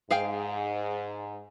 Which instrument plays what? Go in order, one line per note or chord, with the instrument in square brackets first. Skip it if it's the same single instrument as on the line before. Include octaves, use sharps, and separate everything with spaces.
[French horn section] G#2 [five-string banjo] G#4 F5 G5